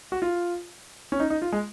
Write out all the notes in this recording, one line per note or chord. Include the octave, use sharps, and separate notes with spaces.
F#4
F4
C#4
D#4
D#4
F4
G#3